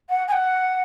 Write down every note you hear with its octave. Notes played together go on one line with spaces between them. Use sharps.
F#5
G#5
F#5